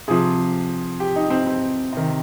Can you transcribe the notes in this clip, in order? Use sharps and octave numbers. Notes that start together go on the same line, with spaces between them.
C3 F3 G#4
G4
D#4
C4
C4
C3 D#3